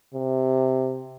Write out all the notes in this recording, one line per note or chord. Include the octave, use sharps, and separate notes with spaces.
C3